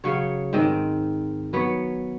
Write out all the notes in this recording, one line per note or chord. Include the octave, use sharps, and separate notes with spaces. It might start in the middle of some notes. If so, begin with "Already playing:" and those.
C#3 F#3 C#5
G#2 D#3 C4 D#5
F#3 B3 C#5